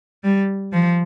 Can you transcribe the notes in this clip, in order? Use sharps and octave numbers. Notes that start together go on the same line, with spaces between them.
G3
F3